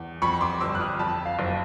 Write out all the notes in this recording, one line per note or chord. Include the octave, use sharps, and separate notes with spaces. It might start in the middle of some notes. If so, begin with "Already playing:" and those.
Already playing: E2
F2 B5 C#6
C6 D6
G1 D6 E6
F#6
D#6 F6
F2 A5 B5
F5
F#1